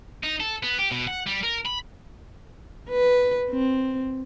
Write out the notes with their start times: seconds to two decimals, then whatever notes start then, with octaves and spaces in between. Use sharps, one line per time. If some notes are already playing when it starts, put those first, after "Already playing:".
0.23 D#4
0.40 A4
0.63 B3
0.79 G4
0.91 B2
1.07 F#5
1.27 G3
1.43 A#4
1.65 B5
2.90 B4
3.50 C4